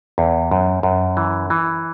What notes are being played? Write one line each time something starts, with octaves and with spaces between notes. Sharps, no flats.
E2
F#2
F#2
E3
E3